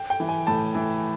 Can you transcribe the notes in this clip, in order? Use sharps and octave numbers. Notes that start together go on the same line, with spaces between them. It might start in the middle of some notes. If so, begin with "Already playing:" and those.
Already playing: G5
G5
E3
G#5
A2 A5
E3